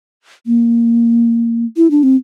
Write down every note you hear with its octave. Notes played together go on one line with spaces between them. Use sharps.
A#3
E4
D4
C4